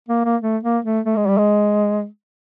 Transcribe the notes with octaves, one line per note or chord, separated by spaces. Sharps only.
A#3
A#3
A3
A#3
A3
A3
G#3
G3
G#3